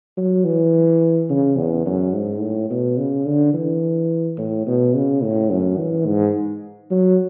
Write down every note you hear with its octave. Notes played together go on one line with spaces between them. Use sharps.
F#3
E3
C#3
E2
F#2
G#2
A2
B2
C#3
D3
E3
A2
B2
C#3
A2
F#2
E3
G#2
F#3